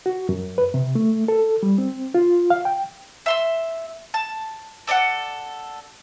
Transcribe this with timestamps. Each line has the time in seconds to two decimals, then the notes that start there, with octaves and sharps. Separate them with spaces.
0.06 F#4
0.29 F#2
0.58 B4
0.74 C3
0.95 A3
1.28 A4
1.63 G3
1.78 C4
2.15 F4
2.50 F5
2.65 G5
3.26 E5 C6 E6
4.14 A5
4.87 A4 D5 D#5 F#5